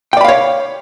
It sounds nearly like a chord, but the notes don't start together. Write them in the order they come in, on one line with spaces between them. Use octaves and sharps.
G5 D5 B5 F5 C#5